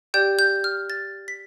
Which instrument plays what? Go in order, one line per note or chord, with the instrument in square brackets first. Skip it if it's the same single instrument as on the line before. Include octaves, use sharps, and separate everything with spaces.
[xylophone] G4 D5 G5 G6
G6
F6
A6
B6